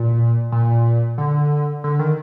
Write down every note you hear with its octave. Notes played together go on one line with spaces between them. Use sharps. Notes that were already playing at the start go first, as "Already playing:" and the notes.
Already playing: A#2
A#2
D3
D3
D#3